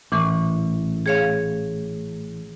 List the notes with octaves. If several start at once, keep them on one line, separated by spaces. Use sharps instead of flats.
A1 A#2 E3 C#6
G#4 C#5 F5